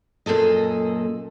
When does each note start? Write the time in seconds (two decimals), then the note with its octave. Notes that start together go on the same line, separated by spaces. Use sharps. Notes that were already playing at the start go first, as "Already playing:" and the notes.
0.26 F#2 A#2 G#4 A4 D#5